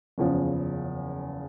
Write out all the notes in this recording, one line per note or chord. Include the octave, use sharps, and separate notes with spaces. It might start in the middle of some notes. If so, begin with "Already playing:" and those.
F#1 E2 C#3 F3